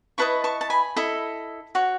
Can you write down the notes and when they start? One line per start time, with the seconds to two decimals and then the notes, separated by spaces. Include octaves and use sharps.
0.18 E4 B4 D#5 A5 C#6
0.44 A5 C#6
0.61 A5
0.70 G#5 B5
0.96 E4 A4 D#5
1.75 F#4 C#5